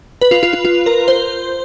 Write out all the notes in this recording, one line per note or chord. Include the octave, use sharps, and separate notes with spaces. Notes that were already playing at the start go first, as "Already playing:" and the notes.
B4
F4
F4
F4
F4
A#4
C5